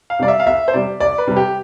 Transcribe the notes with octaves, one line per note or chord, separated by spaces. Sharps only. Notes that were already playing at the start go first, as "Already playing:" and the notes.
F5
C3 G3 D5
E5
F5
C2 E5
C5
C3 G3 D5
C2 D5
B4
C3 G3
G4